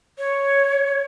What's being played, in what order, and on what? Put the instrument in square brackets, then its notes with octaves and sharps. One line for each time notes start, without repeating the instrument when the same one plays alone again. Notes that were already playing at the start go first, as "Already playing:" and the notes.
[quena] C#5